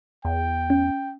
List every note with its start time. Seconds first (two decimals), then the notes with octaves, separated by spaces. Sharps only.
0.25 E2 G5
0.70 C#4